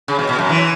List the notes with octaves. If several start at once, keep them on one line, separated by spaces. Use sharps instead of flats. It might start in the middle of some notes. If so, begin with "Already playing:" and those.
C#3
B2
B2
F#2
E3